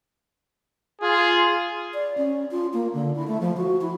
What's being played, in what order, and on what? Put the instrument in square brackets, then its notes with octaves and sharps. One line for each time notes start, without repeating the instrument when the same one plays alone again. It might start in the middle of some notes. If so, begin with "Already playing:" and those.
[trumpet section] F4 G#4
[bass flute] D5
C#4
F4
A#3
D3
E4
A3
F3
F#4
E4